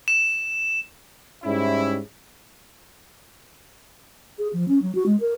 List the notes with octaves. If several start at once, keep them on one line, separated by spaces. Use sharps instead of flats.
E7
G#2 G3 C#4 E4
G#4
F3
C#4
F#3
F#4
G#3
A#4